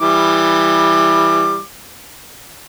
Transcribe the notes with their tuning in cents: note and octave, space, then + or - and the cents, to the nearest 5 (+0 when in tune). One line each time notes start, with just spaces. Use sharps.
E3 +0 G3 +10 D6 +20